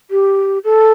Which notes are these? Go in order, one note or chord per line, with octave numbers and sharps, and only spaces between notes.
G4
A4